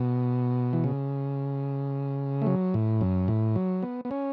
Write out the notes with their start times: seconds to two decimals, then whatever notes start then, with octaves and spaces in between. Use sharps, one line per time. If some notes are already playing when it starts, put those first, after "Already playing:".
Already playing: B2
0.73 E3
0.84 C#3
2.42 A3
2.46 F#3
2.74 A2
3.01 F#2
3.28 A2
3.56 F#3
3.83 B3
4.05 B3
4.11 C#4